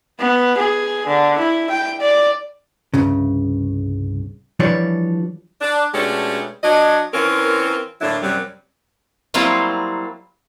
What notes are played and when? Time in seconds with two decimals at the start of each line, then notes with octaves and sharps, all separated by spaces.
0.19 B3
0.58 G#4
1.07 D3
1.39 E4
1.70 G5
2.01 D5
2.94 C2 G2 C#3
4.60 E3 F3 G3 D4 C#5 D5
5.61 D4
5.94 B2 G#3 A3 C#4 D4 G4
6.63 F#3 D4 C#5 D#5
7.13 E3 C4 C#4 F4 A#4
8.01 A2 D3 F#3 A#3 D4 E4
8.22 F#2 C3 F#3 G3
9.34 F#3 G3 A#3 C4 E4 F4